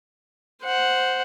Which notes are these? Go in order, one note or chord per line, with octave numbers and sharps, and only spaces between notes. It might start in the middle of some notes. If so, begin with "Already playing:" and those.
C5 F#5